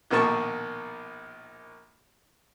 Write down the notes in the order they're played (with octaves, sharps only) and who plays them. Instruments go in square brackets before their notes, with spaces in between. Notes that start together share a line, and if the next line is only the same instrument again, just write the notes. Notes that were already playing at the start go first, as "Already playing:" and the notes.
[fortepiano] A#1 B2 D#3 A#3 A5 C#6